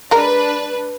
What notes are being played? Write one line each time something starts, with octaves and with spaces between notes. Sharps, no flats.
G#3 D4 A#4 B4 A#5